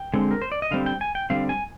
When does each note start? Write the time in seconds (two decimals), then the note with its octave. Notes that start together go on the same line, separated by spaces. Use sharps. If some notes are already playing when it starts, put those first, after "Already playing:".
Already playing: G5
0.14 D3 G#3 C4
0.31 A#4
0.42 C5
0.52 D5
0.62 D#5
0.71 D3 G3 C4 F5
0.86 G5
1.01 G#5
1.15 G5
1.30 D3 G3 C4 F5
1.49 G#5